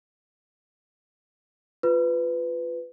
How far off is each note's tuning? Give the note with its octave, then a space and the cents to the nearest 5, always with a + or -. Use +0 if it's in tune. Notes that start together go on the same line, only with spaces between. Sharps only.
F4 +0 B4 +15